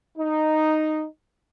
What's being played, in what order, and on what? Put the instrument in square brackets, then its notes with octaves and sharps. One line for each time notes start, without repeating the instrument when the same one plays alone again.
[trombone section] D#4